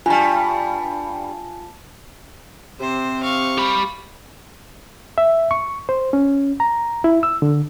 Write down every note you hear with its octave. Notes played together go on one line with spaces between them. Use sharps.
G2 G3 F4 G#5 A5
C3 C4 C5
F5 C#6
G4 B5
E5
C#6
C5
C#4
A#5
E4
E6
D3